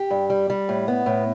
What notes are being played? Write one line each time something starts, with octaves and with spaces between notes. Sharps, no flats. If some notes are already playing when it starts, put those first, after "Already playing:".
Already playing: G4
G2
G3
G3
A2
B3
A2